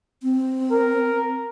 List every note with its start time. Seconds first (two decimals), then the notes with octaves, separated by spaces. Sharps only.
0.23 C4
0.71 A#4